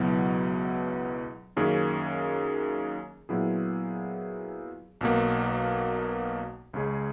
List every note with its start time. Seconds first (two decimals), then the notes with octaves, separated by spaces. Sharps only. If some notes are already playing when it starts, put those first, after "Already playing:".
Already playing: C#2 B2 F#3 B3 E4
1.57 F#2 D#3 A#3 C#4 G#4
3.29 A#2 F#3 B3 E4 G#4
5.01 B1 B2 A#3
6.74 C#2 C#3 G#3 C#4 G#4